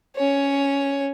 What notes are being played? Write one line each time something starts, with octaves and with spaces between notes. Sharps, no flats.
C#4 C#5